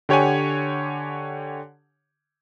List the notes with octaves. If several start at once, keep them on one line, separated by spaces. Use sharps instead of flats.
D3 G4 C#5 F#5 G#5